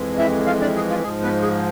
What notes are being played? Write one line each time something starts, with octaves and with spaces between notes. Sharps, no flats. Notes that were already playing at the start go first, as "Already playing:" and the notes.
Already playing: F2 E3 G#3
E4 E5
F4 F5
D4 D5
G#4
F4
G#2 F3 G#3 G#4
B3 B4
G#4